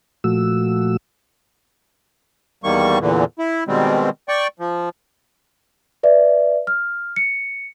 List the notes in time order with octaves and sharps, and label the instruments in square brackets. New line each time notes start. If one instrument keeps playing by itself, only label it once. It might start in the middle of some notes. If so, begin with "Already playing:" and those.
[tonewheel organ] A#2 F3 A3 F#4 E6
[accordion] E2 D#3 G3 A#3 C#6
E2 A#2 D3 E3
E4
B2 D#3 G3 G#3 C4
D5 G5 C#6
F3
[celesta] B4 D5 E5
F6
C#7